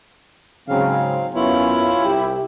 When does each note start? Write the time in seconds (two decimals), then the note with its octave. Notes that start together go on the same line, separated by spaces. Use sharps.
0.68 G#2 C#3 F#3 C4 F5
1.35 F#2 B3 C#4 E4 F4 C#5
2.04 C2 G4